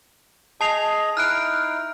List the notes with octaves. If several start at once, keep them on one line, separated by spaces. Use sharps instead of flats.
G#4 D#5 A5 C7 F7
D#4 E4 F6 F#6 D7